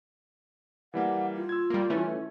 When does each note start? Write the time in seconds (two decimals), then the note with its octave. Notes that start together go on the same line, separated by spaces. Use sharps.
0.94 E3 G3 A#3 F#5
1.36 F4
1.49 E6 G#6
1.70 G3 A#3
1.90 E3 A3 C#4